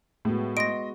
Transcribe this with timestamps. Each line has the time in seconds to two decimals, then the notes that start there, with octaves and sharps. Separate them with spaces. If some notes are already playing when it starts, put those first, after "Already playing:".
0.25 A2 G#3 B3 F#4
0.57 D#5 C6 A#6 D7